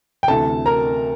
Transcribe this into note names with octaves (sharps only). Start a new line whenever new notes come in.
G5
D2 C3 E3 A4 A5
A#4 A#5